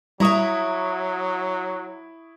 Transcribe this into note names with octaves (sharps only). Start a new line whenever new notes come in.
F#3 G3 E4 E5 A#5 C#6 D#6 E7